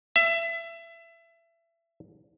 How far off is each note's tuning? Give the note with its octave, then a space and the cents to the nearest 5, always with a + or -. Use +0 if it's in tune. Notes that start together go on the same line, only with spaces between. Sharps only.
E5 +25